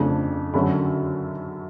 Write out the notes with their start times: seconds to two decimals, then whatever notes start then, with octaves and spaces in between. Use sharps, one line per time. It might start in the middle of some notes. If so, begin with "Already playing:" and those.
Already playing: F2 C#3 F3 A3 D4
0.54 F#2 D3 F#3 C#4 B5